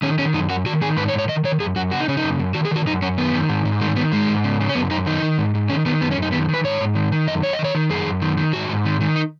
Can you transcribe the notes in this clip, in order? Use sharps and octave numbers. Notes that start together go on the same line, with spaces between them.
D#3 C#4
D#3 C#4
F#2 D#4
F#2 F#4
D#3 F#4
D#3 G#4
G#2 B4
C#5
G#2
C#5
D#3 D#5
D#3 C#5
F#2 G#4
F#2 F#4
C#3 F#4
D#4
C#3 C#4
D#4
F#2
F#2
D#3 F#4
G#4
D#3 F#4
F#2 D#4
F#2 C#4
D#3 B3
D#3
G#2
G#2
D#3 G#3
D#3 B3
G#2 G#3
G#2
C#3
C#3
C#4
F#2 B3
F#2 D#4
D#3 D#4
D#3
G#2
G#2
D#3 C#4
D#3 B3
F#2 B3
C#4
F#2 D#4
D#3 B3
D#3
B4
G#2 C#5
G#2
D#3
D#3
F#2 D#5
F#2 C#5
D#5
D#3
C#5
D#3
F#2 G#4
F#2
D#3
D#3
G#2 F#4
G#2
D#3
D#3
D#4